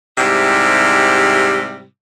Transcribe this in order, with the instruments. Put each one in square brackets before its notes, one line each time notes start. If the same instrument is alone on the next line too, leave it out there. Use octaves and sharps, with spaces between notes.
[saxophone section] G#2 C3 G3 E4